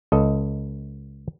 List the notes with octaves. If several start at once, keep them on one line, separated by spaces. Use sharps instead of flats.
C#2 A4 D#5